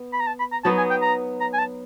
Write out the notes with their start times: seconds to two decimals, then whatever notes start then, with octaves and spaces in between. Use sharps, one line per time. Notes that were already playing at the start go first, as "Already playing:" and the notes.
Already playing: B3
0.13 B5
0.20 A#5
0.27 A5
0.39 B5
0.52 A#5
0.64 F#3 B3 D#4 A5
0.78 G#5
0.90 G5
1.02 A#5
1.41 A#5
1.53 G#5
1.58 A5